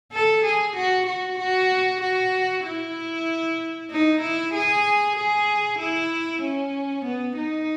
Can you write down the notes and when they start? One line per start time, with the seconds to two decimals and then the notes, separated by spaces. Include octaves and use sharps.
0.12 A4
0.45 G#4
0.76 F#4
1.07 F#4
1.39 F#4
2.02 F#4
2.65 E4
3.91 D#4
4.21 E4
4.54 G#4
5.16 G#4
5.79 E4
6.42 C#4
7.05 B3
7.37 D#4